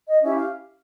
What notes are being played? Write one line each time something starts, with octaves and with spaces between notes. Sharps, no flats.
D#5
C#4 E4 G4 E5
F5